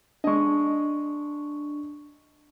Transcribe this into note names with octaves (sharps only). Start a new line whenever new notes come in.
G#3 D4 D#5 C#6